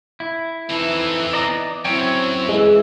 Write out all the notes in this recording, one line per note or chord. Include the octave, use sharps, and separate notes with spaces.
E4
E3 C4 D#4 A4
D5 D#5 A#5
F#2 C4 E4 C#5 G5
E3 G#3 E5